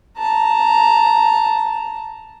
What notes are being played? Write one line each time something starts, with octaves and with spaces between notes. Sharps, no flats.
A5 A#5